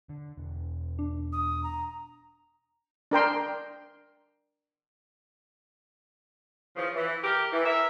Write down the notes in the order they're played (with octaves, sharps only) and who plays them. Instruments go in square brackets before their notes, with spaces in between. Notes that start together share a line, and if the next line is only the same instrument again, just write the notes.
[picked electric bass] D3
E1
[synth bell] D4
[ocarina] D#6
A#5
[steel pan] D4 A#4 G5 C6
[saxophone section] C#3 E3 F3
E3
G4 A#4
E3
A#4 E5